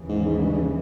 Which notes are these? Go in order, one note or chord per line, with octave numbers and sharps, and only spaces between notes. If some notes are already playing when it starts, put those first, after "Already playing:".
Already playing: D#2 C#3 E3
G#2
G#2
G2
G2